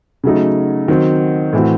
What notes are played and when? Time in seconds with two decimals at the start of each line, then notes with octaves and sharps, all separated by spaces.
0.24 C#3 F#3 A3 D#4
0.88 D#3 F#3 C4
1.53 A2 E3 C4 F#4